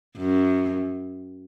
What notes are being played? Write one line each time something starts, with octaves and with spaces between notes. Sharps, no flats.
F#2